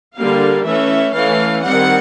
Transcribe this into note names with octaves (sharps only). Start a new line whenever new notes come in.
D3 G3 A#3 F5
E3 A3 C#4 E5
E3 A3 C#4 F5
D#3 G3 C4 F#5